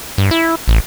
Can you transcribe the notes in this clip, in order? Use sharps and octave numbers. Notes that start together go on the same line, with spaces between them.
G2
E4
A1